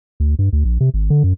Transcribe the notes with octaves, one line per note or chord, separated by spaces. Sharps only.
D2
G2
D2
A#1
C3
G#1
D3
F#2